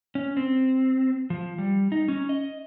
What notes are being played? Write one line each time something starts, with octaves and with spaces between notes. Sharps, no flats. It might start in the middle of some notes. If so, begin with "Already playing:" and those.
C#4
C4
F3
G3
D#4
C#4
D#5